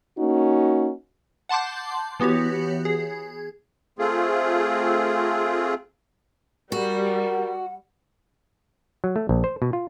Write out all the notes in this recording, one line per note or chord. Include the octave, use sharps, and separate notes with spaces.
A#3 C#4 D#4 F#4
F#5 A5 C6 D6 G6
E3 B3 F#4 G4 C#5
G#4
A3 C4 F4 G#4
G3 F#4 A#4 F#5
F#3
A3
A#1
C5
B2
F4